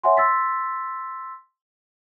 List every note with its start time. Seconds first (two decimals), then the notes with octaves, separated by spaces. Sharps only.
0.04 C#5 E5 F#5 G#5 C6
0.17 C6 E6 A6 B6